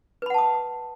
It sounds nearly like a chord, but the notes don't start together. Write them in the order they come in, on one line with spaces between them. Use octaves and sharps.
B4 B5 F#5 A5 D#6